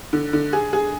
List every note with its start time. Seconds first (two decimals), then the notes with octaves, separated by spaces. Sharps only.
0.13 D3
0.33 D3
0.53 G#4
0.73 G#4